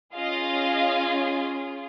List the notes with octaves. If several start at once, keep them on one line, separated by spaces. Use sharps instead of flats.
C#4 F4 G#4 D#5 F5